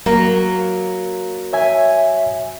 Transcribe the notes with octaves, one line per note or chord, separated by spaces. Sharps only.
F#3 A#3
C#5 E5 G#5